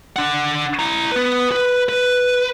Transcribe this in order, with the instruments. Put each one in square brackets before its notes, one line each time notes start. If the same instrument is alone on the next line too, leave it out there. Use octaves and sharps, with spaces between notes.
[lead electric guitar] D4 F#5
E4 A#5
B3 B4
B4
B4